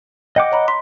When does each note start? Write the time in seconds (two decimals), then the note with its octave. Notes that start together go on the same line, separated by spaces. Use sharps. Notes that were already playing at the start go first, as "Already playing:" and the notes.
0.36 D#5 F#5 G5 D6 G6
0.52 C#5 A#5 B5
0.68 C6 B6